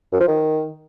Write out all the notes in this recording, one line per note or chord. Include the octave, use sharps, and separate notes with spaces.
F#2
F3
D#3